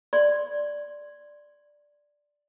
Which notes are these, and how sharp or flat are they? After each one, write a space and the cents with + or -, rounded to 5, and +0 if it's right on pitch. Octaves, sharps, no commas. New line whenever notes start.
D5 +0 C6 +0